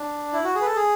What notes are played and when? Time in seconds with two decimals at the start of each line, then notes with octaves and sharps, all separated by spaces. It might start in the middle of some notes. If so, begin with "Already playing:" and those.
Already playing: D4
0.33 E4
0.44 F#4
0.55 G#4
0.61 B4
0.65 A4
0.76 G#4